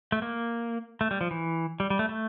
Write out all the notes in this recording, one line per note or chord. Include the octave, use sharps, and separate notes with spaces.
A3
A#3
A3
G3
F3
E3
G3
G3
A3
A3